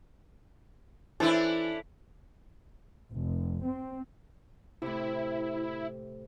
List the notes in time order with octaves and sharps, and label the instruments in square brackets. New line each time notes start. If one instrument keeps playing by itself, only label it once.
[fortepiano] E3 [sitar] C#4 D4 E4 [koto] A4 C5
[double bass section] F1
C4
[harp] A2 C3 [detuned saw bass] E4